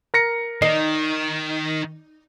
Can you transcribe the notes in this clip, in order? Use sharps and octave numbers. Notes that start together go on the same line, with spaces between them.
A#4 A#6 C#7
D#3 D#4 C7